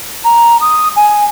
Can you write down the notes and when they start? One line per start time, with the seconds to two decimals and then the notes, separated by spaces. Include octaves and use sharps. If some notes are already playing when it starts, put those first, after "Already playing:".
0.24 A#5
0.61 D#6
0.96 G#5